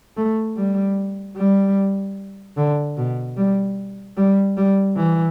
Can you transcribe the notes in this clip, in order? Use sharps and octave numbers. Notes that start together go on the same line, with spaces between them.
A3
G3
G3
D3
B2
G3
G3
G3
E3